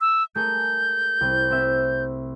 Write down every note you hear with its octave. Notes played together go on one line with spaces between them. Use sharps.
E6
A3 G#4 A#4 G6
C2 C4
C4 E5